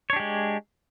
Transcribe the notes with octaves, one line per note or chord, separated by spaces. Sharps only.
G#3 D4 G4 C#5